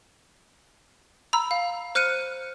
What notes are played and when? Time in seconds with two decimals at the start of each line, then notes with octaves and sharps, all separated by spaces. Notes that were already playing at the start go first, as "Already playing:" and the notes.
1.33 A#5 B5 E6
1.51 F5
1.95 C5 F6 F#6 C#7 D#7